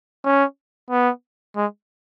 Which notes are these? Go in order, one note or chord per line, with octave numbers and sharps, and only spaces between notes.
C#4
B3
G#3